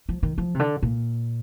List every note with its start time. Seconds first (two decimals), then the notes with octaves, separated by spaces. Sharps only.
0.09 F3
0.23 D#3
0.38 F3
0.55 C3
0.59 D3
0.83 A#2